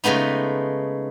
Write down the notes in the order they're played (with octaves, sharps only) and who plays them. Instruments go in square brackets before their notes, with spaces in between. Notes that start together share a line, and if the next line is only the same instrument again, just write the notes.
[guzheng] C#3 G#3 A3 B3 D#4